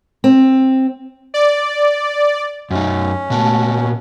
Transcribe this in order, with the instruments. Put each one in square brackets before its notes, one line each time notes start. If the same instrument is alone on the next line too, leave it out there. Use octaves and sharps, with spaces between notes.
[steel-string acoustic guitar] C4
[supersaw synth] D5
[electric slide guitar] F#2 D#4 [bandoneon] C#4
[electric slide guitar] A#2 B3 [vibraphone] A3 A5